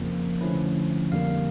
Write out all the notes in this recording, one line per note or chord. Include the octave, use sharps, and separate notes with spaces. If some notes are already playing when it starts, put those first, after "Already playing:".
Already playing: F2 C#3 F3 A#3
D3 F3 A3 C#4 E4 B4
F2 D3 G3 A#3 F5